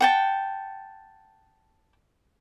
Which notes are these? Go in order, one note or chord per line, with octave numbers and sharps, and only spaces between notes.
F#5 G5 A5